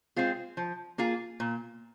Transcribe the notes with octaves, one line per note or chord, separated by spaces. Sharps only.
G#3 C4 F4 G#4
F3
A#3 F4 G#4
A#2